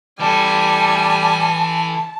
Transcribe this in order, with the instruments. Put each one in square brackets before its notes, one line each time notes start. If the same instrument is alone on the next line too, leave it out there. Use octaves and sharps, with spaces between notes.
[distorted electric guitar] E3 A4 [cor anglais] G3 [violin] G#5 [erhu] A5